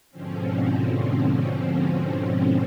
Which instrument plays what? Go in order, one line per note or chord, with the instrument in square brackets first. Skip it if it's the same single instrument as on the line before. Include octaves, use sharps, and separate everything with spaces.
[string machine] G#2 B2 D3 F3 C4 C#4